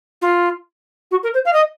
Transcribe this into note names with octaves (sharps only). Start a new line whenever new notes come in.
F4
F#4
A#4
C5
F5
D#5